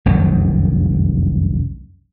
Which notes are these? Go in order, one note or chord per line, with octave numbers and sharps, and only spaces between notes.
F1 C2 F#2 D#3